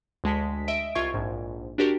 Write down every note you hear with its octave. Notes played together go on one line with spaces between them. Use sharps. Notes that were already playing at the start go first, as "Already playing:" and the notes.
D2 G#3 A5 B6
D#5 E5 D7
C2 F4 E5 C#6 G#6
A#1 G#2
D4 F#4 G4 A#4